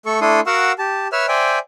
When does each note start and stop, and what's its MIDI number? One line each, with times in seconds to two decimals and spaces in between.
0.06 0.20 57
0.06 0.20 69
0.06 0.20 85
0.21 0.40 57
0.21 0.40 62
0.21 0.40 64
0.21 0.40 69
0.21 0.40 84
0.21 0.40 87
0.47 0.72 66
0.47 0.72 70
0.47 0.72 77
0.47 0.72 78
0.47 0.72 85
0.47 0.72 88
0.79 1.08 67
0.79 1.08 81
1.12 1.26 71
1.12 1.26 73
1.12 1.26 76
1.12 1.26 88
1.12 1.26 89
1.28 1.59 72
1.28 1.59 74
1.28 1.59 76
1.28 1.59 79
1.28 1.59 80